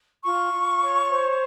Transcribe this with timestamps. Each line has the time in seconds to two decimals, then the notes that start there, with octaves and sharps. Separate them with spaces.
0.24 F4 C#6
0.53 F4
0.82 C#5
1.11 C5